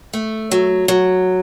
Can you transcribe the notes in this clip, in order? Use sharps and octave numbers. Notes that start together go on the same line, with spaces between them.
A3
F#3
F#3